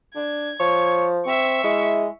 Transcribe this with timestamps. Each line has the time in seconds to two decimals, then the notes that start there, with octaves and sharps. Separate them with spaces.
0.16 D4 G#6
0.60 F3 C#5
1.26 C4 E5 C#6
1.64 G#3 E4